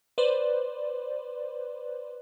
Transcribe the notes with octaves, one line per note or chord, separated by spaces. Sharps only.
B4 C5 D5